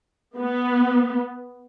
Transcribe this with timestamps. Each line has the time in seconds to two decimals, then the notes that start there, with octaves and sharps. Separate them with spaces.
0.37 B3